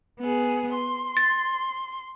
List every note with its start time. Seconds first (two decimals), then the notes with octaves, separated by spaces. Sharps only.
0.20 B3 G#4
0.73 C6
1.17 A6